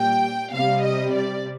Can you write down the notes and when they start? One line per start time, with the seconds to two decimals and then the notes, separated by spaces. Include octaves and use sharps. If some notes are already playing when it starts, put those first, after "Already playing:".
Already playing: A#2 G3 G5
0.53 C3 G3 F5
0.83 D#5
1.13 D5